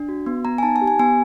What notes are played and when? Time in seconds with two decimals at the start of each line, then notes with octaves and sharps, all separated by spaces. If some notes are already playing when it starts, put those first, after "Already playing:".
Already playing: D4
0.09 F#4
0.26 B3
0.45 B3 A#5
0.58 G#5
0.63 D#4 A5
0.76 G#5
0.81 G4
0.87 G#5
0.99 B3 G#5